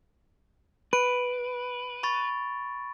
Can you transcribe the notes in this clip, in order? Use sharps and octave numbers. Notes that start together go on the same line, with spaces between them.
B4 D7
B5 C#6 A6